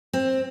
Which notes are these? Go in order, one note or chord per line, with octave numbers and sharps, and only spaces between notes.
C4